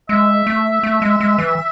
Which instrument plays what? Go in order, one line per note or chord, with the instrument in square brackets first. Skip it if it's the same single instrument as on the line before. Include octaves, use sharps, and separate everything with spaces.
[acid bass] G#3 [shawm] E5
[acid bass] A3
A3
G#3
G#3
E3